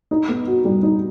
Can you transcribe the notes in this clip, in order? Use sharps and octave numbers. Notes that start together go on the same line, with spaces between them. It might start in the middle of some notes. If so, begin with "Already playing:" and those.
D#4
B3
F#4
G3
D#4